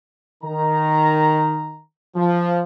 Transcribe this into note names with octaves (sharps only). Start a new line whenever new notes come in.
D#3 A#5
F3